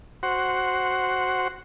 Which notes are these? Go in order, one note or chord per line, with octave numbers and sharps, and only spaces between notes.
F#4 C5 F#5